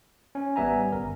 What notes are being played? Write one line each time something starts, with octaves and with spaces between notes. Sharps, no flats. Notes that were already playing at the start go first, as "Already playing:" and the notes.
C#4
A1 G3 B3 E5 G#5 A#5
G1 A#4